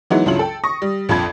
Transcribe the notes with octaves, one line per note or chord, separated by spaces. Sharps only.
E3 F#3 G#3 B3 D#4 E4
C#2 G2 F#3 E4 F4 F#7
A4 G5
C#6 D#6 A#6
G3
A#1 F2 F4 B5 G#6